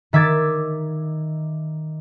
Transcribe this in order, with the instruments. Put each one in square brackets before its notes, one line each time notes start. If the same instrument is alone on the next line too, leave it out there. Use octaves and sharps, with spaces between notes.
[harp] D#3 E5 D6 G#6 A6